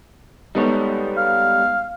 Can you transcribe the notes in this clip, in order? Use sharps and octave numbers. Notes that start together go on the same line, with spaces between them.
G3 G#3 B3 D#4 A4 C#5
F5